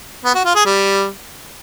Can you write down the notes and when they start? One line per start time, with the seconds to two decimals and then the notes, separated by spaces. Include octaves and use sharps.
0.25 B3
0.35 F#4
0.45 F4
0.55 G#4
0.65 G3